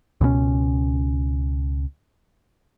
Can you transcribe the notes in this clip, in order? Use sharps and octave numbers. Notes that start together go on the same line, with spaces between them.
C#2 B2 F3 C#4